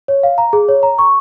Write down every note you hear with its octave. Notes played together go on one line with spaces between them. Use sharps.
C#5
F5
A#5
G#4
C#5
A#5
C#6